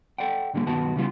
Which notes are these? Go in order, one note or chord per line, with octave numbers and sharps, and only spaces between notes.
A4 D5 F#5 G5
G#2 D3 G3 A3 A#3
B1 G2 D#3 B3 F#4 A5
C#3 E3 G3 B3 F4